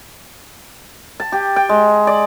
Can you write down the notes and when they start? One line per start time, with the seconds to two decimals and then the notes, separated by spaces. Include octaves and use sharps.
1.20 A5
1.32 G4
1.56 G5
1.69 G#3
2.07 D5